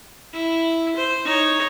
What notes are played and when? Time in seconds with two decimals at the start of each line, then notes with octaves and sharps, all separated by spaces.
0.33 E4
0.96 C5
1.25 D#4 C#5